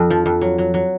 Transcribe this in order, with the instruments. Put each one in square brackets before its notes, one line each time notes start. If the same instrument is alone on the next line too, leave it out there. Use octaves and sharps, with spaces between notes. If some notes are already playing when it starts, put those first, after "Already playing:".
Already playing: [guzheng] F2
F3
F2
F#3
F#3
F#3